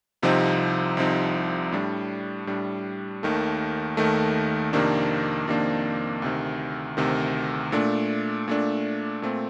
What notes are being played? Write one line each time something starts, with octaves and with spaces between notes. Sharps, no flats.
C2 C3 F3 C4 D#4
C2 C3 F3 C4 D#4
A2 G3 D4
A2 G3 D4
D#2 D#3 A3
D#2 D#3 A3
F2 C3 D#3 A#3 D4
F2 C3 D#3 A#3 D4
D2 C3 D#3
D2 C3 D#3
A#2 A3 D4
A#2 A3 D4
A#2 A3 C4